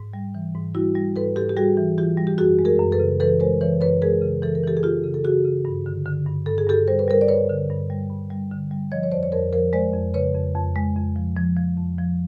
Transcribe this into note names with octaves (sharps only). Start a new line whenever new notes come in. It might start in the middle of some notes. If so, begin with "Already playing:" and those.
Already playing: G#2
G3
E3
G#2
G3 E4 F#4
G3
G#2 A4 B4
G#2 G4 A4
G4
G3 F#4 G#4
E3
E3 F4 G4
G3
G4
F#2 F#4 G#4
G#3
G#4 A#4
F#2
A4 B4
C#3
E3 A4 B4
G#3 A#4 C5
E3 B4 C#5
F#2 B4 C#5
G#3 G#4 A#4
C#3
E3 A4
A#4
E3 G4 A4
G#4
E3 F4 G4
C#3
A4
C#3 F#4 G#4
C#3
G2
D3
D3
G2
G2 A4
G#4
G2 G4 A4
G3 C5
B4
G3 A#4 C5
D5
G2 B4 C#5
D3
G2
G3
G2
G3
D3
G3
F3 C#5 D#5
C#5
F2 C5 D5
C#5
F2 A#4 C5
F3 A#4 C5
G#3 C5 D5
F2
C#3 B4 C#5
F2
F2
G#3
F2
F3
F3
F3
F2
F3